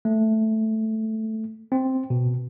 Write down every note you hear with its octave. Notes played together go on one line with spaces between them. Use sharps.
A3
C4
B2